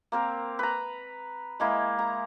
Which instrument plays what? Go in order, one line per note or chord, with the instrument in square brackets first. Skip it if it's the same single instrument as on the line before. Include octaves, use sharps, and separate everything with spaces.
[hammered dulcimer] A#3 C4 A#4
B4 A#5
G#3 A#3 E4
A#5